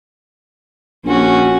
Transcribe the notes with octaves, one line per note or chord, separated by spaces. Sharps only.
A#1 C#4 F#4